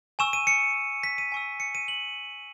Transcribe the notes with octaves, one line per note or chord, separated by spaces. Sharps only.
G#5 C#6 E6 E7
D#7
C#7
B6
D#7
G#5 C#6 E6
C#7
D#7
F#7